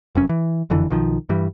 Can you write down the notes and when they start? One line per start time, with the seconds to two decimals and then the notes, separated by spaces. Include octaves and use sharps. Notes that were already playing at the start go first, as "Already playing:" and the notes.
0.15 F1 F#2 C#4
0.29 E3
0.70 F#1 F2 D3 E3
0.90 B1 D#3 F3
1.29 G2 E3 G3